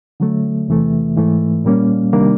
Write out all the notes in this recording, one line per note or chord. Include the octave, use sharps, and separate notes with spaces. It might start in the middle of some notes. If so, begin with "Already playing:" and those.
D3 F#3 A3
E2 C3 E3 A3
G#2 E3 A3
A#2 G3 A#3 C#4
C3 D#3 G3 A#3 D4